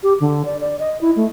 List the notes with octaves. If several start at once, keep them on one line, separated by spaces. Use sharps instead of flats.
G4
D3
D5
D5
D#5
E4
A3